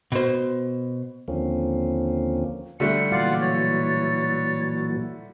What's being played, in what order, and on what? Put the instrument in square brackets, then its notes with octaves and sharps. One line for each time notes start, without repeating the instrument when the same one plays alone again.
[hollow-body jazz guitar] B2 C5
[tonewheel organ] D#2 D3 F3 A#3 C4 C#4
[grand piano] D3 G3 A3 [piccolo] C#7
[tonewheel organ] A#2 E3 F#3 [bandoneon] F4 D5 F5 [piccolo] F#5
[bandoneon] C#5 [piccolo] A6